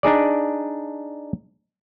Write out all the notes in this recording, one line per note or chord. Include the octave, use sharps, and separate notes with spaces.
D4 D#4 G#4 D5